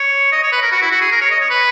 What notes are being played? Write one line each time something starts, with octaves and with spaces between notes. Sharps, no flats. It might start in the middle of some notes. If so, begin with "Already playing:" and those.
Already playing: C#5
D#5
C#5
B4
A#4
F#4
E4
F#4
G#4
A#4
C#5
D#5
C#5
B4